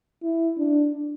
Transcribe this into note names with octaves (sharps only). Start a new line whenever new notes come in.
E4
D4